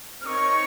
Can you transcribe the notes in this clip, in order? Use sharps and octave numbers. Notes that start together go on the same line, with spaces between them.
C4 D#4 A#4 C#5 C#6 F6